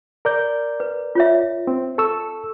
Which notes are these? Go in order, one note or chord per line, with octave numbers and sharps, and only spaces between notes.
A#4 D5 G6
B4
F4 C#5 E5
C4
A4 C#6 E6